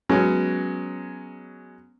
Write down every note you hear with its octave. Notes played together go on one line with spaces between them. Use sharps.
F#3 G#3 B3 C#4